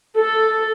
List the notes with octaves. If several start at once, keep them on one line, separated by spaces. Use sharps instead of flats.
A4